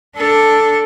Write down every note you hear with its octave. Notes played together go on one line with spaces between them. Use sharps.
D4 A4